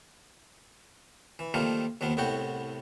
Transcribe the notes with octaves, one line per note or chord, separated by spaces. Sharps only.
E3
D#3 F3 G3 A3 A#3 F4
D#2 D#3 F3 B3
C2 A2 B3 F#4 G5